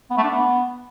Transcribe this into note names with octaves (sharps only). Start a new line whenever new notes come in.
B3
A3
D4
B3